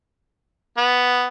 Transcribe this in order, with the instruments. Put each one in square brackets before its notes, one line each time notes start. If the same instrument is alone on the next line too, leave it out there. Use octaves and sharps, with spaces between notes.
[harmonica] B3